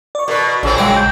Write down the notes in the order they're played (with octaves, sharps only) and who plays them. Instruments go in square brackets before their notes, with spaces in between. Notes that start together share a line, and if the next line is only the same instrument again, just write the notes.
[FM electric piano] D5 C#6
[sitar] B2 B4 [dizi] A#4
[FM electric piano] A#1 [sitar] C#3 F#3 C4
[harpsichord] G#3 D6 [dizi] G5
[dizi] G6